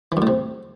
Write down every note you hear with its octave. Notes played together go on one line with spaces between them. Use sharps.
E3
F#2
A2
C3